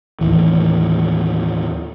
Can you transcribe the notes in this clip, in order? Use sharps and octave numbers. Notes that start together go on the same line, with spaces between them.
D#2 A2 E3